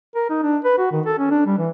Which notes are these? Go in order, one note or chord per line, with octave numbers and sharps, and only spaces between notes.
A#4
D#4
D4
B4
F#4
D#3
A4
C#4
D4
G3
E3